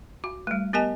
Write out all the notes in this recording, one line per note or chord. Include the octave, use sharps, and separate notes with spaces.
F#4
G3 A3
B3 G4 A#4 D#5 G#5 A5